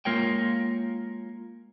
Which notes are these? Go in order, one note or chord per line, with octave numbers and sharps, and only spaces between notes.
G#3 A#3 F4 A#4 C#5 G5